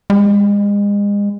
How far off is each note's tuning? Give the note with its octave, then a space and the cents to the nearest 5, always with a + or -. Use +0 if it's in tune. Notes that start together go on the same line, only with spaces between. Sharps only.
G#3 -35